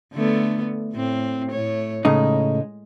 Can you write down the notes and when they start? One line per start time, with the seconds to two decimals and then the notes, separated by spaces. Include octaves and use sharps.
0.14 D3 A3 B3
0.93 A2 C4
1.51 A2 A3 C#5
2.05 A2 C#3 G#3 D#4